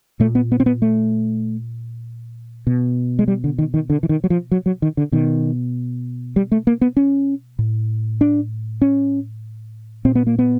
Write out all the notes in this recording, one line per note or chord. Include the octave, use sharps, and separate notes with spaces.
A#2 A3
B3
B3
C4
B3
A3
B2
G#3
G3
D3
D#3
D#3
D3
E3
D#3
F#3
F3
F#3
F#3
D#3
D3
B2 D#3
G3
A3
A#3
B3
C#4
A2
D4
C#4
A#2 C4
B3
A#3
B3